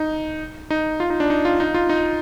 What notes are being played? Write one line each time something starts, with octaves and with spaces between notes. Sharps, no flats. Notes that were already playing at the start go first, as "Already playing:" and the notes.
Already playing: D#4
D#4
F4
D#4
D4
D#4
F4
D#4
F4
D#4